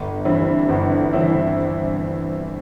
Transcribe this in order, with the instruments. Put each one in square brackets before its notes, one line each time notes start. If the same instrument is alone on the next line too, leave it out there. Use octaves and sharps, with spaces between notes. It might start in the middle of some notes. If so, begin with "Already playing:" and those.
Already playing: [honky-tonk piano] G1
G2 E3 C4 E4
G1
E3 C4 E4